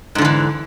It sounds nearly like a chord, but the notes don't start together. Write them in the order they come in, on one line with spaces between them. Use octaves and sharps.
G#2 D3 F3 E3